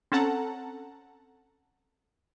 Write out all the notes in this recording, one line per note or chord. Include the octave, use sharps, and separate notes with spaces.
C4 C#4 A4 F#5 A5 A#5